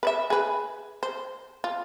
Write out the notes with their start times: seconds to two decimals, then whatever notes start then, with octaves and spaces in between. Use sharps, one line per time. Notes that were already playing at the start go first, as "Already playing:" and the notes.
0.03 B4 D5 E5
0.30 G#4 B4
1.03 C5
1.64 F4